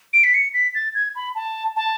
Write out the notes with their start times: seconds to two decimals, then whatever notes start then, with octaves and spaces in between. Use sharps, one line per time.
0.13 D7
0.24 B6
0.34 C#7
0.54 B6
0.75 A6
0.95 G#6
1.16 B5
1.35 A5
1.76 A5